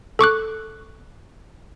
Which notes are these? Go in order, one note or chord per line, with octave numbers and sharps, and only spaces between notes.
A4 C#6 D6 F#6